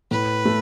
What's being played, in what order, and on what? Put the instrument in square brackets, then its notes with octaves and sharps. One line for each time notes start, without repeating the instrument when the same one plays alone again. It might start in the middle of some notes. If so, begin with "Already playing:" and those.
[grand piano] A2 [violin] B4
[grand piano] A3